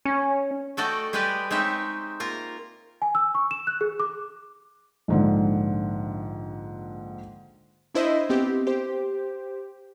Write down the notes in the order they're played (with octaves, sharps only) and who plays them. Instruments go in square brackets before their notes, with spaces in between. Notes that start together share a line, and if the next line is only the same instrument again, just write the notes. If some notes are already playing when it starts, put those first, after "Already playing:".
[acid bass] C#4
[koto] A3 F#4 A4 D5 D#5 G5
G3 G#3 G4 B4 D5 D#5
G#3 C4 D#4 G4 C#5 E5
A#3 F4 A#4
[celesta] G#5
E6
C#6
E7
F#6
G#4
D6
[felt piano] A#1 G#2 D3
[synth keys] D4 E4 C5 D#5
B3 C4 G4
G4 C5